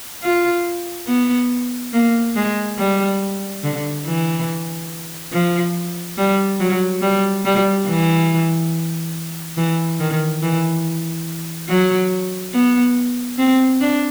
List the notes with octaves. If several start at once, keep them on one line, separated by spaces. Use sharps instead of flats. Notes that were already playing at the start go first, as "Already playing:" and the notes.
F4
B3
A#3
G#3
G3
D3
E3
F3
G3
F#3
G3
G3
E3
E3
D#3
E3
F#3
B3
C4
D4